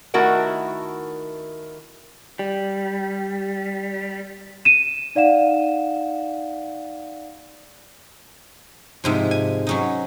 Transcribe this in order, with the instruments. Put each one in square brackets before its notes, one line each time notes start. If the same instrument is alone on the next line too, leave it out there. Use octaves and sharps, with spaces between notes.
[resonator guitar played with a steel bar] D#3 A3 E4 F#4 A#4 F#5
[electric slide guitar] G3
[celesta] D#7 E7
D#4 D5 F5 F#5 E7
[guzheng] G#2 C3 F3
G#5
F#3 C#4 D#4